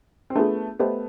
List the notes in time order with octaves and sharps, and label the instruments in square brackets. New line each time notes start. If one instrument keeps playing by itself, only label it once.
[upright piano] C4
[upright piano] A3 B3 [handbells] D4 F4 G#4
[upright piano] A3 B3 [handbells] G4 C5 D#5 G5